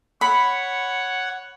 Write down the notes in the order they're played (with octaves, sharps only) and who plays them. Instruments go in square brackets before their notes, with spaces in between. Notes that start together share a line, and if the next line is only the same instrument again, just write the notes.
[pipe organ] C#5 F#5 [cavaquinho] B5